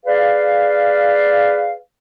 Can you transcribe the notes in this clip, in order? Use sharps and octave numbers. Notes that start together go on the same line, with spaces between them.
G#4 B4 D5 F5